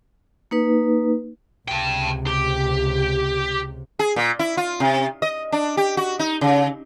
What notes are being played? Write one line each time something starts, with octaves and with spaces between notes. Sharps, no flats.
A#3 D#4 B4
C#2 C3 G5 A5
G4
G#4
A#2
E4
F4
C3
D#5
D4
G4
F#4
D#4
C#3